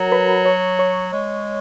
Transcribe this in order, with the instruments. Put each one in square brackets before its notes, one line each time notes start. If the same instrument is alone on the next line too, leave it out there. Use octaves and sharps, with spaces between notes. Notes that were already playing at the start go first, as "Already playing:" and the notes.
Already playing: [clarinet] F#3 [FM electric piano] F#4 A#4 F#5 A#5
[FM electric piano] B4 B5
C#5 C#6
C#5 C#6
[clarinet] G#3